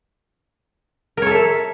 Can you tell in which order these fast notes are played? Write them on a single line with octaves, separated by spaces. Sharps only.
A#4 C#5 A4 E5